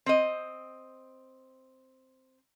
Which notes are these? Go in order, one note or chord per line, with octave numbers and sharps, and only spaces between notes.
C4 D#5